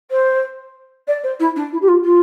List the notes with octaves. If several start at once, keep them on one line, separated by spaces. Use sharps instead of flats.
C5
D5
C5
E4
D4
E4
G4
F4
F4